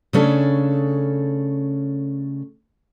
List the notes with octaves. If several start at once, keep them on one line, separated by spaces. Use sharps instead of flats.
C#3 A3 C#4 D4 A4